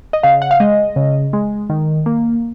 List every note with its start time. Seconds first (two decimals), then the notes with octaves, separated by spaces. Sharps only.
0.13 D#5
0.23 C#3 F5
0.42 F#5
0.51 F5
0.60 G#3 D#5
0.96 C#3
1.33 G#3
1.70 D#3
2.06 A#3